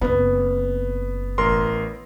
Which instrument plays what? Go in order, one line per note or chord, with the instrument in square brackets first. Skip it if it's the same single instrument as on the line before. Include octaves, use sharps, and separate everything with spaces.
[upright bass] F#1 C4 [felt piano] B3
[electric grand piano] A1 A#4 C6